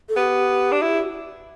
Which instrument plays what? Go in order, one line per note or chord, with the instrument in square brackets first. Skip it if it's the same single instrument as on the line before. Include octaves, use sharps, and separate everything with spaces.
[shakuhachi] A4
[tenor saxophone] B3 [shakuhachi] G4
[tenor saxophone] D4
E4